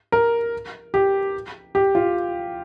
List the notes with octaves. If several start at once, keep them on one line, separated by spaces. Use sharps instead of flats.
A#4
G4
G4
F4